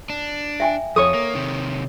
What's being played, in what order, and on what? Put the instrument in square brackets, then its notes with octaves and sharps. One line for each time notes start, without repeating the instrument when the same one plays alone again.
[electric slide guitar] D4
[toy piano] E5 G5 G#5
[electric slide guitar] F2 [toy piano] A4 [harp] C#5 C#6 D#6
[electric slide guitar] A#3
C3 D#3